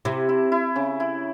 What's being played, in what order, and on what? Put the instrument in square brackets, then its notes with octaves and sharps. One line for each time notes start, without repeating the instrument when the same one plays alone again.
[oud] C3 [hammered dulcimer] E4
[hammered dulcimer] E4
E4
C#3
E4